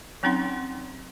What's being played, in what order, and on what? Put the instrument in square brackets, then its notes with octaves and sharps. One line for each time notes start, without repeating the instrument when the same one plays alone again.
[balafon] F#3 C4 C#4 D#4 F#5 C6